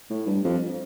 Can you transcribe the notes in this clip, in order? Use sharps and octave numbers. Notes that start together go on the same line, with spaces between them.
A2
G2
F2